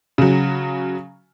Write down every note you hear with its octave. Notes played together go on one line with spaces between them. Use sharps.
C#3 F#3